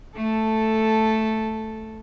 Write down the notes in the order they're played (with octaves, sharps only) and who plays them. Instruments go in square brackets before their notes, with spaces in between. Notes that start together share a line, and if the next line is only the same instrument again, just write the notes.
[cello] A3 A4